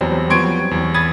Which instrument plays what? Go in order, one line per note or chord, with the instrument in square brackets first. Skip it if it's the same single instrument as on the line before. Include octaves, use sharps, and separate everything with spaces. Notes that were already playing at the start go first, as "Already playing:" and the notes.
[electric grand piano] E2 [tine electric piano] F#3 G3 C4
[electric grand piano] F3 B3 C6 [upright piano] C#6 G#6 D7
[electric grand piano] E2
[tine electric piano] B5 D#6 A6 [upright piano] G#6